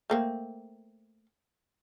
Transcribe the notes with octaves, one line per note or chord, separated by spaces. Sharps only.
A3 A#3 C4